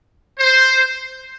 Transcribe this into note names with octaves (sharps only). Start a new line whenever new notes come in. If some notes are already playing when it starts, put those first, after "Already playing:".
C5